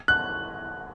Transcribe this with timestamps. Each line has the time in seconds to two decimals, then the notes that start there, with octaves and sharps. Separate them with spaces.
0.08 F#6